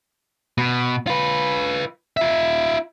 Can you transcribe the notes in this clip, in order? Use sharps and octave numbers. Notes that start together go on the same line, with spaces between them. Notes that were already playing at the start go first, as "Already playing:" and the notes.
B2
F4 B4
F4 E5